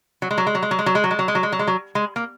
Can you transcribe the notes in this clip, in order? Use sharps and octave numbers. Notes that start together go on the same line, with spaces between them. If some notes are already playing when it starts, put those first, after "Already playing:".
F#3
G#3
F#3
G#3
F#3
G#3
F#3
G#3
F#3
G#3
F#3
G#3
F#3
G#3
F#3
G#3
F#3
G#3
F#3
G#3
A#3